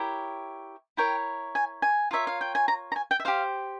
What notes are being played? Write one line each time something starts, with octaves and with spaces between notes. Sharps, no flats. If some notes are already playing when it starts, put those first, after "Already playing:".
Already playing: E4 G4 A#4 C#5
E4 A#4 C#5 G5
G#5
G#5
F4 A#4 C#5 E5
F5
G5
G#5
A#5
A#5
G#5
G5
E5
G4 C5 F5